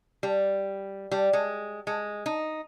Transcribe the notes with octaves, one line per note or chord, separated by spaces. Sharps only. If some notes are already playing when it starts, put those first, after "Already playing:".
G3
G3
G#3
G#3
D#4